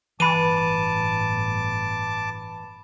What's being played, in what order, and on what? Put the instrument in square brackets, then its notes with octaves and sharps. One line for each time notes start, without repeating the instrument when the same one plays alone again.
[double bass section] G1 A2 [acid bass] E3 [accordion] A5 D6 [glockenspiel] B5 D#7